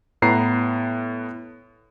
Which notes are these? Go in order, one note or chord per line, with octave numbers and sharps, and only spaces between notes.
A2 B3 B4 A#5 C7